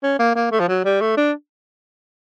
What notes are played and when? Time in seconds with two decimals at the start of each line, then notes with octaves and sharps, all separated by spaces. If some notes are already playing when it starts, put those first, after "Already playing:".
0.03 C#4
0.19 A#3
0.35 A#3
0.52 A3
0.60 F3
0.68 F#3
0.85 G3
1.01 A3
1.17 D4